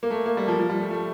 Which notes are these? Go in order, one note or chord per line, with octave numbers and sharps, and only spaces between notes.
A#3
A3
A#3
G3
F3
F3
G3
A3
A3